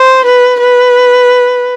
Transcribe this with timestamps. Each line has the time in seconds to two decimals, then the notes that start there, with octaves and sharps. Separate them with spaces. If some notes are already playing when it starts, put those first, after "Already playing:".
Already playing: C5
0.25 B4
0.60 B4